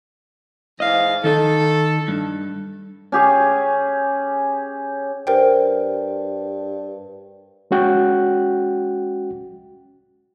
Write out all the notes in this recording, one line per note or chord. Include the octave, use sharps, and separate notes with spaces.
G#2 E3 D#5 F5
D#3 D#4 A4 D#5
G2
C#4 G4 G#4
G2 A#4 C5 G5
G#3 C#4 F#4 G5 F#6